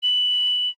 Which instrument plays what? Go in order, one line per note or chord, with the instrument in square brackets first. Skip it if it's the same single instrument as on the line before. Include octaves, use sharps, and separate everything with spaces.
[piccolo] F#7